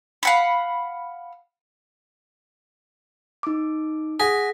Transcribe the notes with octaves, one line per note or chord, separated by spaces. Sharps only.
F5 F#5 B5
D#4 D6
G#4 F#5 A#6 B6